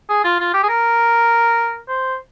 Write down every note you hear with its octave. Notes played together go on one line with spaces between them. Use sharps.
G#4
F4
F4
G4
G#4
A#4
C5